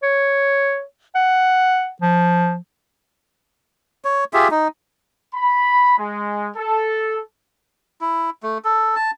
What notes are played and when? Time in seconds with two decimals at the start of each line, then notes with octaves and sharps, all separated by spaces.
0.03 C#5
1.15 F#5
2.02 F3
4.05 C#5
4.33 F4 G4 G#4 E5
4.51 D#4
5.34 B5
5.97 G#3
6.56 A4
8.01 E4
8.43 A3
8.64 A4
8.96 A5